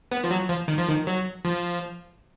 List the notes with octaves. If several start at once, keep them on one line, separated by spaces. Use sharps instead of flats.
B3
F3
F#3
F3
D#3
F3
D#3
F#3
F3